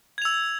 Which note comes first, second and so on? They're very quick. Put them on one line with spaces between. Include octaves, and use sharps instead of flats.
G#6 F7 E6